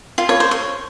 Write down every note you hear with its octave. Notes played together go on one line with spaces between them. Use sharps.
F4
C#5
C5
C#5